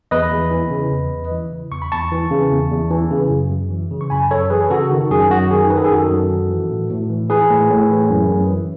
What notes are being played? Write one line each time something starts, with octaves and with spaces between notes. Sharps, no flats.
E2 B4 D#5
E2
E3
C#3
E2
E2
E3
C#3
E2 C#6
B5
E2 A5 C#6
E3
C#3
E2
E2
E3
C#3
F#2
F#2
E3
C#3
C#6
F#2 G#5 B5
F#2 A4 C#5
E3 G#4 B4
C#3 F#4 A4
D#3 F#4
F#2 G#4
F#2 F#4
D#3 G#4
D#3 B4
A4
G#4
F#2 F#4 A4
F#2
D#3
E3
A2
A2
E3
E3 G#4 B4
A2
A2
E3
F#2
F#2
E3